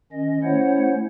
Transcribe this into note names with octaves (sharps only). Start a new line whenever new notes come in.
D#3 C#4 D#5
A3 C#4 E4 C5 C#5 F#5